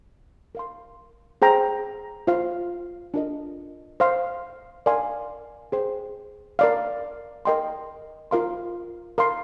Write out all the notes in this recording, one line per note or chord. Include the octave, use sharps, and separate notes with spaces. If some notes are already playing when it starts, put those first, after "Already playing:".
A#4 F5 C6
G#4 C5 G5 A#5
F4 C5 F5
D4 F4 A#4 D#5
C5 F5 C6
A#4 D5 F5 G#5 C6
G#4 C5 G5
A#4 D5 F5
A#4 D#5 G5 C6
F4 A#4 F5 C6
A#4 F5 C6